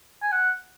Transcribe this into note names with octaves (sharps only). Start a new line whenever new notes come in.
G#5
F#5